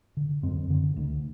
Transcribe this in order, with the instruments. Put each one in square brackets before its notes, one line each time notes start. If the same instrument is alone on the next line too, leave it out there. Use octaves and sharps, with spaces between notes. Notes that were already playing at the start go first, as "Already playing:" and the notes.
[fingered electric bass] D3
F#2 C4
D3
D2